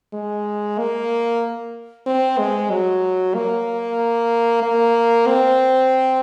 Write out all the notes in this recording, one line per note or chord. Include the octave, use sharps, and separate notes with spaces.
G#3
A#3
C4
G#3
F#3
A#3
A#3
C4